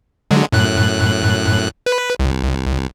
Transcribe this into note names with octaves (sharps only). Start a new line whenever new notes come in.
D3 F#3 G#3
F#2 A2 F#6
B4
C2